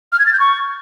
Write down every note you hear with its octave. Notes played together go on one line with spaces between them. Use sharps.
F6
G#6
A6
G6
C#6